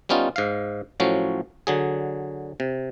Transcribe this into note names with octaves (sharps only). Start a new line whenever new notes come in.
G3 B3 C#4 D#4 F4
G#2 F5
A2 F3 F#3 C#4
D3 F#3 G#4
C3